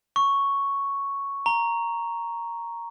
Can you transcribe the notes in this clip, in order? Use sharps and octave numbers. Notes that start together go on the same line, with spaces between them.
C#6
A#5